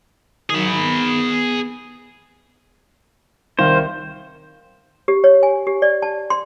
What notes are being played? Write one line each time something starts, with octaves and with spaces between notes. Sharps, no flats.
D#3 F#3 G#4 B5
B3
C2 D#3 C5 F5
G4
C#5
G#5
G4
D5
A5
C6